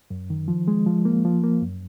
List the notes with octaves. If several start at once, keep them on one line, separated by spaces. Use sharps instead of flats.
F#2
D#3
F3
G#3
F3
A#3
F3
A#3
F#2